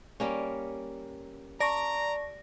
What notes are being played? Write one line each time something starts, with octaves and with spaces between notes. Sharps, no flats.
G3 A#3 C#4
D5 A5 A#5 C#6 A#6